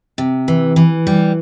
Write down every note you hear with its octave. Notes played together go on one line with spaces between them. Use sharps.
C3
E3
E3
G3